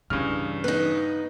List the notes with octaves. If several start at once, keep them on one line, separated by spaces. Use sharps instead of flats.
G2 C#3 E3 C#4 F6
B3 D#4 B4